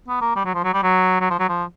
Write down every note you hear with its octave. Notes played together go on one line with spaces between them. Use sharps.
B3
A#3
G3
F#3
F3
F#3
G3
F#3
F#3
F3
F#3
F3